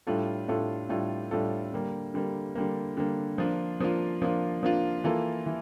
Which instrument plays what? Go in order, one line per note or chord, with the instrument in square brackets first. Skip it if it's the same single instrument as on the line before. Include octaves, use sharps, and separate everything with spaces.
[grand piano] A2 G3 D4 F4 A4
A2 G3 D4 F4 A4
A2 G3 D4 F4 A4
A2 G3 D4 F4 A4
D3 G3 A#3
D3 G3 A#3
D3 G3 A#3
D3 G3 A#3
F3 A#3 D4 F4
F3 A#3 D4 F4
F3 A#3 D4 F4
F3 A#3 D4 F4
E3 A#3 F4 A4
E3